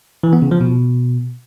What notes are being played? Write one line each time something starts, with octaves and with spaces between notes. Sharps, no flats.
E3
B3
C#3
F3
B2